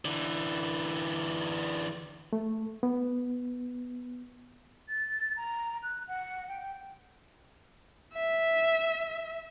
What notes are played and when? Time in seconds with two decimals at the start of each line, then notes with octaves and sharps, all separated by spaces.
0.05 D3 E3
2.33 A3
2.83 B3
4.89 A6
5.37 A#5
5.83 F#6
6.08 F#5
6.48 G5
8.14 E5